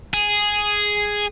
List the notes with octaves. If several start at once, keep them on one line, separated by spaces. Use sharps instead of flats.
G#4